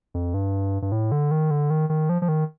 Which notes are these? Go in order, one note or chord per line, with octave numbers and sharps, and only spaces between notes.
F2
G2
G2
A2
D3
D#3
D3
D#3
D#3
F3
F3
D#3